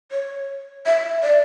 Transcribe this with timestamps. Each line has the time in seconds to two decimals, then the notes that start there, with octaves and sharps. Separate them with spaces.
0.12 C#5
0.86 E5
1.23 D5